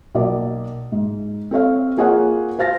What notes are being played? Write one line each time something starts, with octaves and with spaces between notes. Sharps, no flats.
B1 A#3 D5
G#2
C4 A4 C#5 F5
A#3 F4 G#4 A#4 C#5 F#5
C5 F5 A6 A#6